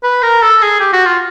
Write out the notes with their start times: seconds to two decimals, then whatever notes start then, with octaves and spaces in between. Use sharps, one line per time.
0.03 B4
0.22 A#4
0.43 A4
0.62 G#4
0.80 G4
0.93 F#4
1.06 F4